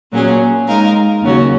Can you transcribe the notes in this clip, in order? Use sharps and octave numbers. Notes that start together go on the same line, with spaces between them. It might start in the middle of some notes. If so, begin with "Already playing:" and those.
A#2 F#3 C#4 G#4
G#3 D#4 A#4 F5
D#2 C#3 F#3 C#4 F#4